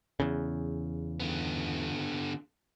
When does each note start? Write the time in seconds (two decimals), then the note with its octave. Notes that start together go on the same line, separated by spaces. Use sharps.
0.20 E2 C#3
1.20 D3 B3